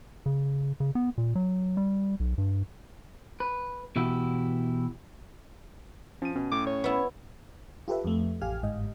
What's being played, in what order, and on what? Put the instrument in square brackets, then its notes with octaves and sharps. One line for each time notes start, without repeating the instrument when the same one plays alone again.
[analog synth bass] C#3
C#3
B3
A#2
F#3
G3
B1
G2
[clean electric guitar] B4
B2 E3 E4 F#4 G4
[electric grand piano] F3 D#7 [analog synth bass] C#4
[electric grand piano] B2 [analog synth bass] C#4
[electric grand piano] A2 [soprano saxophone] D6
[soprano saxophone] C#5
[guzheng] B3 E4
[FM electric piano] F4 G4 A4 B4 E5
F2 A3
A1 G4 F5 G#5 F6
G1 G#2 D#5